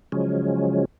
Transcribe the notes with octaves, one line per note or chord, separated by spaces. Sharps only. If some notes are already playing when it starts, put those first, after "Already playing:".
C#3 F3 F#3 G#3 C#4